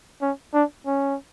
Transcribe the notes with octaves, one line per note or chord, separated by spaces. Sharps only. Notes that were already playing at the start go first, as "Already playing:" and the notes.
C#4
D4
C#4